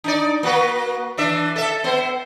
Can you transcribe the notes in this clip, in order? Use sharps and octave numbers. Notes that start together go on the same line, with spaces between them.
D4 D#4 D5
A#3 F#4 B4
E3 D4 E5
A4 E5
B3 C5